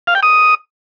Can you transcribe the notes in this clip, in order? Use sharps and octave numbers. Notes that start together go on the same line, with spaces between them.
F5
G5
D#6